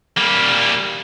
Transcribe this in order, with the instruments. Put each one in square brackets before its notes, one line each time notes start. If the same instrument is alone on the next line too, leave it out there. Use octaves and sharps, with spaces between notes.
[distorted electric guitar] G3 A#3